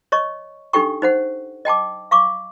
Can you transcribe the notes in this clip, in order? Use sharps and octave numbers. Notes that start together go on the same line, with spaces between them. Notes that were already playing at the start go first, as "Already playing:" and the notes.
C#5 D#5 C#6
D4 D#4 G4 A4 G5 C#6
D#4 C5 F#5
D#5 G5 A5 D6
F5 C#6 D6